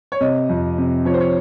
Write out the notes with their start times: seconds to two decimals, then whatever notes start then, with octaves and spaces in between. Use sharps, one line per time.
0.12 C#5
0.20 C3 D#5
0.49 F2
0.78 C3
1.05 F3 C#5
1.14 C5
1.20 C#5